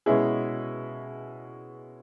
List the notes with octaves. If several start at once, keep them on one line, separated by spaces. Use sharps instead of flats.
B2 G#3 C#4 E4 G#4